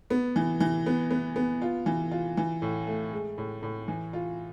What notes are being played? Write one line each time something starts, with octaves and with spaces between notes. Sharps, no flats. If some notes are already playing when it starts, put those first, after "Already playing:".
B3
E3
E3
B3
B3
B3
F4
E3
F4
E3
A2
A3
G#3
A2
A2
E3
F4